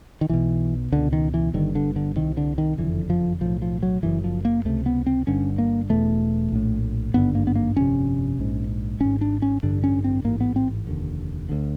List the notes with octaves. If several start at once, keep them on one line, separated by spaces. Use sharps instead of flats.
D#3
B1 B2 E3
C#2 B2 D3
D#3
E3
G1 G2 D3 D#3
D3
D3
C2 C3 D#3
D3
D#3
F#1 F2 D3 E3
F3
B1 A2 F3
F3
F#3
F#1 F#2 C#3 E3
F3
A#3
C#2 C3 A3
B3
C4
G1 G2 D3 C#4
A#3
E1 E2 B2 A3
A#1 A2
G#1 G2 D3 B3
A#3
B3
A#3
G1 F2 C3 C#4
A#1 G#2
G#1 G#2 C#4
D4
C#4
A1 G2 D3 D4
C#4
C4
A1 G#2 A#3
B3
C4
F1 D#2 D3
D2 D3